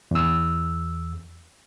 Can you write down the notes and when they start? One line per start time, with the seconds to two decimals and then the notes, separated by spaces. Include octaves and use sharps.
0.11 E2 E6